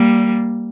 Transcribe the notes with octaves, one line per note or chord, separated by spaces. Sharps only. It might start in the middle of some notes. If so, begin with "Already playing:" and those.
Already playing: G3 A#3